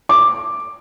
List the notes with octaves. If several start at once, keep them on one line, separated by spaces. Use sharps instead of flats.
D6